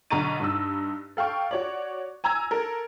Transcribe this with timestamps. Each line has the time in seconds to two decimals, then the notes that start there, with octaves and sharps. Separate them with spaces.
0.10 B1 D3 A#5 C#6 A6 D#7
0.40 G2 D#4 E6
1.17 A4 F5 G5 C#6
1.51 F#4 C#5 D5
2.24 G#5 A#5 E6 G#6
2.51 A4 A#4